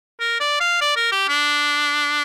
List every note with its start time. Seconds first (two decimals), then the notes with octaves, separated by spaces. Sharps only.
0.21 A#4
0.40 D5
0.61 F5
0.81 D5
0.96 A#4
1.12 G4
1.29 D4